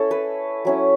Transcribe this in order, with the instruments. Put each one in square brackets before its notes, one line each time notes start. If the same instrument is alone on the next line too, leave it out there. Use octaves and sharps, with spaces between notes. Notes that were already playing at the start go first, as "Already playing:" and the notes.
Already playing: [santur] C#4 E4 A4
B4
F#3 C#4 E4